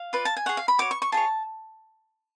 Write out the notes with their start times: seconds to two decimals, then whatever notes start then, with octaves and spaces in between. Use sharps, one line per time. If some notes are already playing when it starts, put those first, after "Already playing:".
Already playing: F5
0.13 F4 B4 D5
0.25 A5
0.37 G#5
0.46 G#4 C#5 F#5
0.57 F5
0.68 B5
0.79 F#4 C#5 D6
0.91 C#6
1.02 C#6
1.12 F4 G#4 C#5 A5